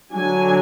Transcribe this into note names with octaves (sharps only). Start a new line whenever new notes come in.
D3 F#3 D4 G#5